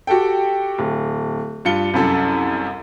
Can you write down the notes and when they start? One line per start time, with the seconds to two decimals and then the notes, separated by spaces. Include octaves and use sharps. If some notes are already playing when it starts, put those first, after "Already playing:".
0.07 F#4 G4 A4 G5
0.78 D1
1.65 G2 F4 C#7 G7
1.94 C2 F#2 A4